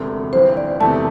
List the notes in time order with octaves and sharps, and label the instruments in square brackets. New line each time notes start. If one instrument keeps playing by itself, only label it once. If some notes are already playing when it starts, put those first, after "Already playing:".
Already playing: [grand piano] E1 D2 C3 A3
[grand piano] G1 G2 E3 C4 [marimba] C5
[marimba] D5
[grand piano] E1 E2 C3 A3 [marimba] A5